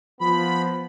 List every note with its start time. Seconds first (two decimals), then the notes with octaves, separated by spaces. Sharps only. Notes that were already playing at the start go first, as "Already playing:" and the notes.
0.21 F3 B3 B5